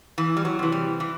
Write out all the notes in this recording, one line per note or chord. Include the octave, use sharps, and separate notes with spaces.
E2 E3
G3
F#3
C3 E3
G3
E3